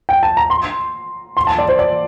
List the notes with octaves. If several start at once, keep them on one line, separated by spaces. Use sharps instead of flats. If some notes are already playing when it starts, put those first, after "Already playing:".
G5
A5
A#5
C6
C6
A5
D5
C5
D5